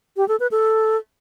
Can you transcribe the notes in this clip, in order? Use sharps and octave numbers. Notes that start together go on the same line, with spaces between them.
G4
A4
B4
A4